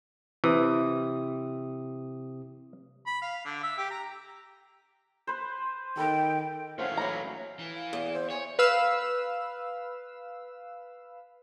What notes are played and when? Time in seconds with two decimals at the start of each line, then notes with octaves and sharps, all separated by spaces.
0.44 C3 E3 D#6
3.07 B5
3.22 F5
3.45 D3
3.63 E5
3.78 G4
3.91 A#5
5.27 B4 C5
5.97 D#3 A4 B4 D#5 G5
6.79 A3 C#4 C5 C#5 F5 F#5
6.97 F#3 A#3 A#5 B5
7.59 E3
7.75 F5
7.93 E2
8.13 C5
8.30 C#5 G#5
8.59 B4 F5 E6